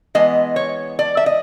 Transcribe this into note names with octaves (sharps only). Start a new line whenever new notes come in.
E3 G#3 B3 D#5
C#5
D5
E5
D#5